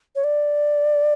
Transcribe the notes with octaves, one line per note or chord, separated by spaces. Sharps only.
C#5
D5